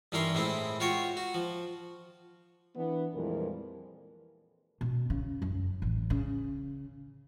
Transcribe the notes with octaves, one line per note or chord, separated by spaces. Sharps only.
G2 E3 C#4 D#4 A#4 C6
A2 G#3 C4 E4
F4 F#4 C#5 G5 C#6
F#4
F3
E3 B3 D4
F2 A#2 E3 G3 G#3 A#4
B2
C#3
F#2
A1
C#3